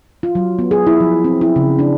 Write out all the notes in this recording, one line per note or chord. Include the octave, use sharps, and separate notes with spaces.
F4
F#3
B3
G#4
E4
F3
C4
E4
C#3
D4